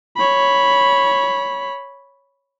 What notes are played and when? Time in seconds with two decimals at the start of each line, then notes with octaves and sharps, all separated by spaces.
0.17 C#5 B5